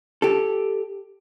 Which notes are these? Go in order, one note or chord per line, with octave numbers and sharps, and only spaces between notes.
G4 A4